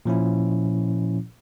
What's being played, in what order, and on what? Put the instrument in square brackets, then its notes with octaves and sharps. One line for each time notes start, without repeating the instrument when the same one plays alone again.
[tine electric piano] A#2 F3 C#4 E4